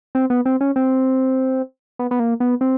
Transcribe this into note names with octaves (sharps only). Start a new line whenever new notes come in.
C4
B3
C4
C#4
C4
B3
B3
A#3
B3
C4